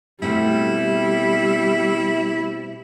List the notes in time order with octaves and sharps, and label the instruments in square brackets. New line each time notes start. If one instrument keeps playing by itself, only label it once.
[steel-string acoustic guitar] B2 A3 C4 [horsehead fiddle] G3 [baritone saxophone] E4